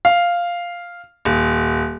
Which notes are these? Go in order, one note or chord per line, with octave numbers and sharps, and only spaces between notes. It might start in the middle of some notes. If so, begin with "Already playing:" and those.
F5
D#1